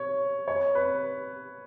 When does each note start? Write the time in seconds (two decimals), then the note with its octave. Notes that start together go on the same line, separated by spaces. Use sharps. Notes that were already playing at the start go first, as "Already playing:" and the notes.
Already playing: C#5
0.48 C#5
0.75 B4